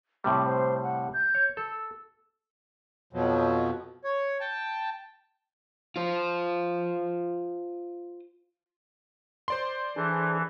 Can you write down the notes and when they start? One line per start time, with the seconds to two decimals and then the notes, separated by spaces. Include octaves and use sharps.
0.24 A2 C3 G3 D6
0.46 C5
0.83 F#5
1.14 G6
1.35 C#5
1.57 A4 E6
3.13 F2 B2 F3 F#3
4.04 C#5
4.41 G5 A5
5.96 F4 C5
9.48 C5 D5 C6
9.96 E3 D4 G#4 A4